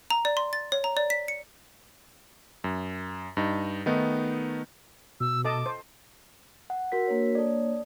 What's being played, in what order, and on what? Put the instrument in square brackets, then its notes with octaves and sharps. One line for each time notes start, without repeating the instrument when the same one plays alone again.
[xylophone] A#5
D5
C6
A6
C#5
A#5
D5
B6
C#7
[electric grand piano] F#2
G2 D#4
D#3 A3 B3 D#4
[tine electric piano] B2 [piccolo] E6
[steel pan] A4 D#5 A5 [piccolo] D6
[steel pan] C5
[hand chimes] F#5
F#4 A#4 B6
[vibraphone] A#3 D4 C#5
[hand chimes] A4 D5